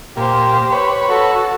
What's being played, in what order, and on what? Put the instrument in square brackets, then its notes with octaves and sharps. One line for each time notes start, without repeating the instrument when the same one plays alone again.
[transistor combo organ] A#2 [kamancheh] G4 C5
[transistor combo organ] B4 C#5
[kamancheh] F#4 A4